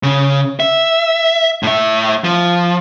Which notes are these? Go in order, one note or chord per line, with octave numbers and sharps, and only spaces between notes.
C#3
E5
A2 E5
F3